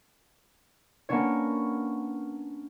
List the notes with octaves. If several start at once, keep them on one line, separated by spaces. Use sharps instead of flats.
A#3 B3 C#4 D4 C#5